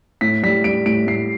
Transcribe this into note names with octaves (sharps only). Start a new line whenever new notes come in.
A2 B6
G3 B6
G3 D7
A2 D7
A2 C7